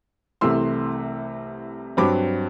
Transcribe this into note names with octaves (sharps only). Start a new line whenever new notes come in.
C2 C3 E3 A3 C6 E6
G2 F#3 C4 B5 D6